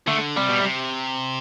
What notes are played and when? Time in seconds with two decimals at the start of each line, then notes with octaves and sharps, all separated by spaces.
0.07 D3 A3
0.37 C3 G3
0.49 B2
0.60 C3